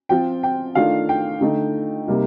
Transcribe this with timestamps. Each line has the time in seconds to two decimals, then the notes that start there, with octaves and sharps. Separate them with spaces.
0.09 F3 C4 F4 G5
0.43 G5
0.75 D#3 A3 D4 F4 F5
1.09 G5
1.41 D3 A3 D#4
2.07 C3 G3 A#3 D#4